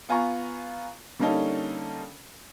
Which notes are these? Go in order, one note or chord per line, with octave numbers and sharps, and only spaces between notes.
B3 F4 G#5 A#5 C#6
D3 G3 A#3 C#4 D#4 A4